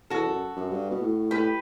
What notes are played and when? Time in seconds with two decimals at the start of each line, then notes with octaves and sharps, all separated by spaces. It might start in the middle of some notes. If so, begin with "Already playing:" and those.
0.10 E2 F#4 A4
0.26 F#2
0.56 F#2
0.71 G2
0.91 B2
1.01 A2
1.31 A2 G4 B4